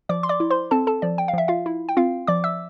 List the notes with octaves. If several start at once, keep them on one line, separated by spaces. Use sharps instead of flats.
F3 D5 D6
C6
D5 D6
E4
C5 C6
C4 A4 A5
A4 A5
F3 D5
G5
F5
F3 E5
F4 F5
E4
G5
C4 F4 F5
F3 D5 D6
E5 E6